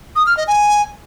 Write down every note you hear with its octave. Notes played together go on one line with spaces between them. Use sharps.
D#6
F6
D#5
G#5